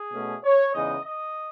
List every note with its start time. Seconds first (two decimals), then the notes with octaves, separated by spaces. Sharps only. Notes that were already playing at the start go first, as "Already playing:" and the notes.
Already playing: G#4
0.13 B2 A3 C#4
0.43 C#5
0.74 E2 C#3 G#3 D#4 D#5
1.04 D#5